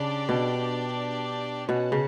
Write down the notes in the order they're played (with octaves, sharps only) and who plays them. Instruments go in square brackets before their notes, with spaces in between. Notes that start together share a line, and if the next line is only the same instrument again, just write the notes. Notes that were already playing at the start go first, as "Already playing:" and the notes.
Already playing: [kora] C#3 [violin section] D4 G4 D5
[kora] B2
[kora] B2 [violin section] C#4 F#4 C#5 F#5 A5
[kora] C#3